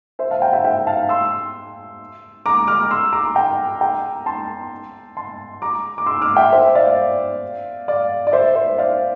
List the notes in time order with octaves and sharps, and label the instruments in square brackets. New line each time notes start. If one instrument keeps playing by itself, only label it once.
[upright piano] C5 E5
F5 A5
G5 A#5
E5 G5
E5 G5
F5 A5
C6 E6
A#5 D6
D6 F6
C6 E6
A#5 D6
G5 A#5
G5 A#5
A5 C6
A5 C6
A#5 D6
D6
C6 E6
D6 F6
E5 G5
C5 E5
D5 F5
D5 F5
D5
C5 E5
C5 E5
D5 F5